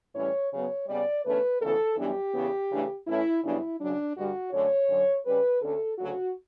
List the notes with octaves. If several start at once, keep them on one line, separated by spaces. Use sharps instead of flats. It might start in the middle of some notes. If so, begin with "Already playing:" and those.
A2 E3 G3 C#4 C#5
C#3 F#3 B3 C#5
C#3 G3 B3 D5
E2 D3 A3 C#4 B4
D2 C#3 E3 B3 A4
F#2 E3 G3 B3 D4 G4
E2 C#3 E3 B3
C#3 E3 A3 D4
A2 E3 A3 C#4 E4
F#2 C#3 G3 B3 D4 E4
F#2 C#3 F#3 D4
G2 D3 G3 F#4
F#2 D3 A3 C#5
F#2 D3 F#3
C#3 G3 C#4 B4
D2 D3 A3 C#4 A4
D2 C#3 F#3 A3 F#4